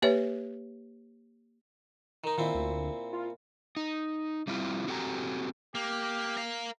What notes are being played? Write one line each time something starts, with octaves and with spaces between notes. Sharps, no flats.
A#3 G4 B4 C#5 E5
D#3 D#4
A#2 D#3 C4 E4
D2
F4
D#4
G3 C4 E4 F4
C4 F#4 G4 A4 G#5 A#5
A#3 G4
A#4 F5